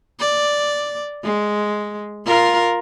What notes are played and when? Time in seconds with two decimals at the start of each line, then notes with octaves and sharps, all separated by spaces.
0.20 D5
1.24 G#3
2.25 F4 A#4